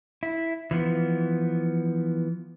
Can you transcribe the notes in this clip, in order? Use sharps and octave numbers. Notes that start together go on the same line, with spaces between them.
E4
E3 F3 B3